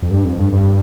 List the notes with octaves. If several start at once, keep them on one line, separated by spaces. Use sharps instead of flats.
F2
G2
F2
G2
G2